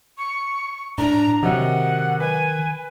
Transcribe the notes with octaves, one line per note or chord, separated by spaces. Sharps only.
C#6
A2 D4 A#5
C3 D#3 F#3 D#5 F#5
B4 G#5